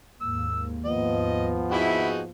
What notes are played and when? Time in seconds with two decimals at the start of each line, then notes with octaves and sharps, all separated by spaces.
0.21 D#2 G#2 A#3 E6
0.85 F3 B3 D#5
1.71 D#4 E4 F#4 G#4